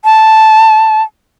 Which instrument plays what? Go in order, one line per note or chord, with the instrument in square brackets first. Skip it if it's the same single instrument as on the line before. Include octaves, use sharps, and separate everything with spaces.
[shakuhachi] A5